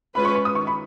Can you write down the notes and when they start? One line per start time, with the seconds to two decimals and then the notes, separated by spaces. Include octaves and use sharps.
0.15 G#3 C#4 F4 B4 B5
0.25 C#6
0.35 C#6
0.45 D#6
0.55 D#3 C#6
0.67 B5